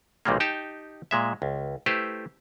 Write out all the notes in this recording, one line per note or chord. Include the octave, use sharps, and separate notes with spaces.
B1 A#2 D#3 G3 G#3 A#3
D#4 G4 G5 A5
A#2 G#3 E5
C#2
A3 E4 G4 B4 C5